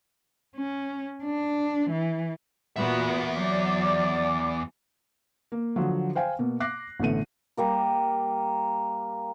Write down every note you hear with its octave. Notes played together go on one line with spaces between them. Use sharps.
C#4
D4
E3
E2 A#2 B3 F#4 E5
F#3 D5 D6
A#3
D3 F3 F#3
C5 F5 G5 G#5
B2 A#3
D6 F#6 A#6 C7
A1 B2 D3 A3 D#7
G3 A#3 A#4